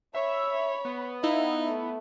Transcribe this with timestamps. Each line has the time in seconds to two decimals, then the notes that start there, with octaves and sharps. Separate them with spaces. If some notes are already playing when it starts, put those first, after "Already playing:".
0.14 C#5 E5 B5
0.85 B3
1.24 D#4 E4 F5
1.67 A3